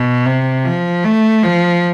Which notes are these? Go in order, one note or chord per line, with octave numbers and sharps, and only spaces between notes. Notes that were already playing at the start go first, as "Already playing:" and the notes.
Already playing: B2
C3
F3
A3
F3